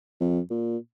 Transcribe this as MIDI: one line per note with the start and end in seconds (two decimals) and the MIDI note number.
0.20 0.40 41
0.50 0.77 46